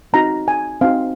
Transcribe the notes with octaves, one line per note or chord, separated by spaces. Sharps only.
C4 D#4 F#4 A#5
G#5
C4 D#4 F#4 F5